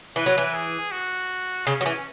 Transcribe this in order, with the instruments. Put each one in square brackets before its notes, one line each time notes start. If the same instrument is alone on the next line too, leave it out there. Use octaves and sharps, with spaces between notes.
[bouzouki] E3 [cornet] B4
[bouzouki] F#3
E3
[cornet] G#4
F#4
[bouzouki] C#3 [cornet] C#4
[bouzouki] F#3
E3